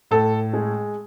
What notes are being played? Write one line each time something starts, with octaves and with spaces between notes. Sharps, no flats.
A2 A4
G#3